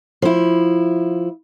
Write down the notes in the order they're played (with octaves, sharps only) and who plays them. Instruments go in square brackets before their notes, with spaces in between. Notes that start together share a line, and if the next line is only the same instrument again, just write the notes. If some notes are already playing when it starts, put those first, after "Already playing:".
[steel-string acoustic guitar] F3 E4